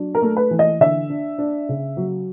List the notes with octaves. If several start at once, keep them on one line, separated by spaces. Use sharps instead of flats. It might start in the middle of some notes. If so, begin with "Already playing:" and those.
Already playing: F#3 D4
A#4
A3
B4
E3
D#5
D3 E5
D4
D4
C#3
F#3